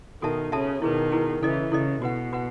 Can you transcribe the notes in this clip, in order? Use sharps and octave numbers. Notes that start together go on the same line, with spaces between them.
B2 D#3 F#4 A4 E5 A5
C#3 F#4 A4 E5 A5
B2 D#3 E4 G#4 B4
E4 G#4 B4
C#3 E3 E4 A4 D#5
C#3 E4 A4 D#5
B2 F#4 B4 F#5
F#4 B4 F#5